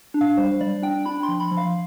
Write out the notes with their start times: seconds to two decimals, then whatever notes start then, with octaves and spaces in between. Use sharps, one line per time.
0.14 D4
0.21 F5
0.37 G3 C5
0.61 G3 D5
0.82 D4 G5
1.06 D4 B5
1.23 C6
1.28 F3
1.40 B5
1.51 F3
1.57 F5